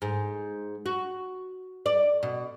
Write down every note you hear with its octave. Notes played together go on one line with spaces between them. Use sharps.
G#2
F#4
D5
B2